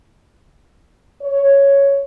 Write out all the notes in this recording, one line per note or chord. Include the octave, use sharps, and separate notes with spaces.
C#5